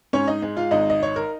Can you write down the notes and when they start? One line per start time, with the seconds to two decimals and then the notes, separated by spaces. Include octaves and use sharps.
0.13 G#2 C#4 C#5
0.28 D#4 D#5
0.42 G#3
0.57 F4 F5
0.71 G#1 D#4 D#5
0.90 D#5
1.00 D#4 C#5
1.16 A#4